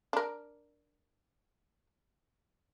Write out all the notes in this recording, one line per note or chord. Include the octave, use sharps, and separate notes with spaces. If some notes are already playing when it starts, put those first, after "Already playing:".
D4 A#4